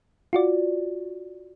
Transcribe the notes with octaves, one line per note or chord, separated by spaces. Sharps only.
F4 F#4 D5